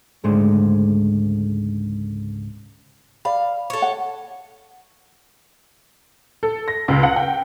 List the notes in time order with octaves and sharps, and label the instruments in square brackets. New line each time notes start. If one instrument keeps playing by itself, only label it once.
[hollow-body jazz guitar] C#2 G#2 D3 G#3 A3
[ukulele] D5 B5 [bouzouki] F5
[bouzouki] A4 C#5
[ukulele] F#5
[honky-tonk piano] A4
A#6
C#2
F#5
G5